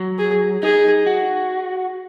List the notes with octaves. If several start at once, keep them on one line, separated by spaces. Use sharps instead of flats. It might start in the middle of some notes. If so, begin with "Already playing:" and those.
Already playing: F#3
G#4
D#4 G#4
F#4